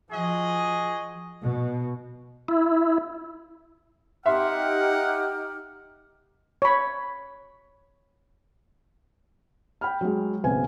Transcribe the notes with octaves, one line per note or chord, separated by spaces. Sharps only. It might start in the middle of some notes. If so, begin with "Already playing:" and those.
F3 F#4 G#4 D#5
B2
E4
D#4 G4 E5 F#5 C6 F6
C#5 B5
G5 B5 F6
F#3 G#3
F#1 B1 C4 B4 G#5